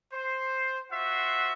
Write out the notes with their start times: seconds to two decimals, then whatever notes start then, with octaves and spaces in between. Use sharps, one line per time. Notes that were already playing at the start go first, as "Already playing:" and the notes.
0.13 C5
0.91 F4 F#4 C5 E5 F#5